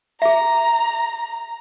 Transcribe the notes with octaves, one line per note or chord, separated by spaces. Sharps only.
G#4 E5 A#5